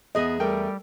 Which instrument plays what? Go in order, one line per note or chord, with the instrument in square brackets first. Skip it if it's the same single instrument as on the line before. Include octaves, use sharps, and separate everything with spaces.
[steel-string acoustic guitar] E2 G#4 E5 [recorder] B3 [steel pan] D#5
[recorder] G3 [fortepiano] A3 A#4 G5